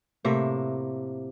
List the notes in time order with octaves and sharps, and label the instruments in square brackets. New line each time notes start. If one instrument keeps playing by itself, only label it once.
[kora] A2 C3 A#3 E5